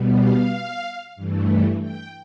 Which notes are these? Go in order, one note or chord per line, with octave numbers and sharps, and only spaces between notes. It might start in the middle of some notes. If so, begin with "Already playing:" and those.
Already playing: B2 G3 B3
F5
G2 E3 A3
G5